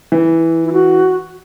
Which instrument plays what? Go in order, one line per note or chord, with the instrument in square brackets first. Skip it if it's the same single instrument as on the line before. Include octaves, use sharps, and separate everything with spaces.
[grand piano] E3
[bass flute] E4
F#4